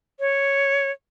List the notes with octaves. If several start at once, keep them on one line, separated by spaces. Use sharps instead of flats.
C#5